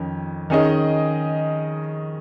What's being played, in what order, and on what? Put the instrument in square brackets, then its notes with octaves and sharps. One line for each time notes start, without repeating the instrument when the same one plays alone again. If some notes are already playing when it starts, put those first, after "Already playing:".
Already playing: [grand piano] F2 D#3 C#4
D#3 C#4 G#4 D#5